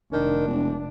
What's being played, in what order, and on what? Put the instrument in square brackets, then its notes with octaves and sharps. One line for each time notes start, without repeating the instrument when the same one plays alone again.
[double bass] F1 D4 [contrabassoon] D#3
[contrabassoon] E1